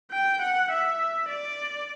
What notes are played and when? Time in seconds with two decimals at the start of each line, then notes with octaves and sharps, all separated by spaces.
0.11 G5
0.41 F#5
0.71 E5
1.28 D5